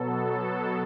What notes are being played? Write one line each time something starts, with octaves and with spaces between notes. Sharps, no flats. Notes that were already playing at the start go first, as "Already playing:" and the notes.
Already playing: B2 F#3 B3 A4